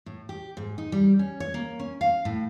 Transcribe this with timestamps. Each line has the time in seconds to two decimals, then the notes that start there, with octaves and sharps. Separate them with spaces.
0.06 A2
0.29 G4
0.57 G#2
0.78 D#4
0.92 G3
1.19 C#4
1.40 C#5
1.54 A#3
1.80 C#4
2.01 F5
2.25 A2